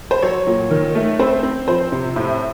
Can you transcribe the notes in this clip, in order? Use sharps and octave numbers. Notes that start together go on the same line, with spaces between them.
C5
F#3 C#5
A#2
D#3
A3
C4 C5
C4
F3 C5
C3
A2